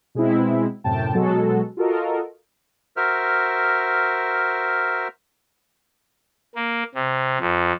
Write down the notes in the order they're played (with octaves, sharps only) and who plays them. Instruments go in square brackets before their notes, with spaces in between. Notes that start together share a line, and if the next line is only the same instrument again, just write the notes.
[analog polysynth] B2 G#3 C4 E4
F#2 A2 C3 G5 A5
B2 F#3 G#3 F#4 A4
F4 F#4 A4 A#4 D#5
[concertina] F#4 A#4 C5 E5 F6
[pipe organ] A#3
C3
F2